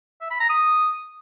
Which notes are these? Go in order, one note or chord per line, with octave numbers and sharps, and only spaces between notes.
E5
B5
A#5
D#6